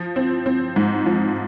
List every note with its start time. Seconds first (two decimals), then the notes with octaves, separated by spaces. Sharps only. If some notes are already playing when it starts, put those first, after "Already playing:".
Already playing: F3
0.16 C4
0.46 C4
0.76 G#2
1.06 F3